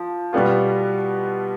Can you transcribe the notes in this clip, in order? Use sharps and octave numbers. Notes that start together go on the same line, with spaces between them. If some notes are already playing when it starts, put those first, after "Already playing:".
Already playing: F3
B2 G3 B3 F4